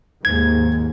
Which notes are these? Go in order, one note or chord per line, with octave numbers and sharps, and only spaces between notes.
D#2 G#2 G#6